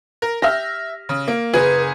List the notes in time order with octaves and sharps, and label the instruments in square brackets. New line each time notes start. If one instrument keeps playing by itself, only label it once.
[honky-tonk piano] A#4
[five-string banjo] G4 [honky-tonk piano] E5 F6 A#6
[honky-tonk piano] C#3
A#3
[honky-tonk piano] F#1 G#4 [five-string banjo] B4